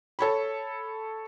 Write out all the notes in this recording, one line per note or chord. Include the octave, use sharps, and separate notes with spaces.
A4 C#5 B5